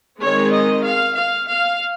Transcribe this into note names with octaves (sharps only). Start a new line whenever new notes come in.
D#3 G#3 C4 C#5
D#5
F5
F5
F5